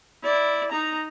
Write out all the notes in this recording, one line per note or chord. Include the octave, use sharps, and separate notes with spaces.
E4 D5
D#4 A#5